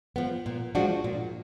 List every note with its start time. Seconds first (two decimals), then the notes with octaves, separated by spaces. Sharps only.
0.16 F3 B3
0.46 A#2
0.75 F3 G#3 D4 F#4
1.04 A#2